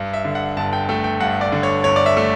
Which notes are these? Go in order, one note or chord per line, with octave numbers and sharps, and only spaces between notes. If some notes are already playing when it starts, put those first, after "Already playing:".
Already playing: G2
E5
D3
F#5
G1 A5
G5
A3 G5
G5
G2 F#5
D5
D3
C#5
G1 C#5
D5
E5
A3